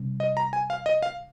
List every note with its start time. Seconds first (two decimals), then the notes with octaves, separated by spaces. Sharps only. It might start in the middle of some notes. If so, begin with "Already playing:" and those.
Already playing: C3 G3 C#4
0.20 D#5
0.37 A#5
0.53 G#5
0.70 F5
0.86 D#5
1.02 F5